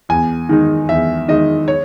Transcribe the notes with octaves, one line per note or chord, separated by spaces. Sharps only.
E2 G#5
D#3 G#3 D#4
E2 E5
D#3 G#3 D#4 D#5
C#5